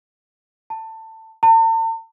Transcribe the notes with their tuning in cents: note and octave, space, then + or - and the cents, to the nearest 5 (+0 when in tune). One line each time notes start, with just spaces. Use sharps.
A5 +20
A5 +45